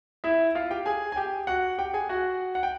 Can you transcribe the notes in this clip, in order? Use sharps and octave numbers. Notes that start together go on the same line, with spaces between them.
E4 E5
F4 F5
G4 G5
G#4 G#5
G#5
G4 G5
F#4 F#5
G4 G5
G#4 G#5
F#4 F#5
F#5
G5